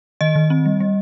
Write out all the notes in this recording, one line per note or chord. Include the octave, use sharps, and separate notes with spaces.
D#3 D#5
D#3
C4
G3
G3